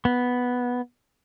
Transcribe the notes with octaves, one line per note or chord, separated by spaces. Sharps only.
B3